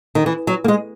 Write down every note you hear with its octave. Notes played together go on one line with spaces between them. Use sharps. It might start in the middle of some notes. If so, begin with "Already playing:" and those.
D#3
E3
F#3
A#3
G#3